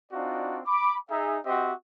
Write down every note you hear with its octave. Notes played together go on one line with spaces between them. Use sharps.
C4 D4 D#4 F4 F#4 D5
B5 D6
D#4 G#4 E5
C4 F#4 G4 C5 D#5 E5